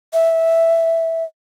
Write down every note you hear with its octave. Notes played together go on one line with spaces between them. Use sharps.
E5